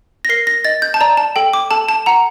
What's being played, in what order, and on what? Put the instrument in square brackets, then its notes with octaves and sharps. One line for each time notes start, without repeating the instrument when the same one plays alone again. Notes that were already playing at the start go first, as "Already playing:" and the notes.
[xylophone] A#6
A#4 C7
A#6
D#5 A6
G6
A5
D5 A#5
A5
A4 G5
D6
A4 A5
A5
F#5 A#5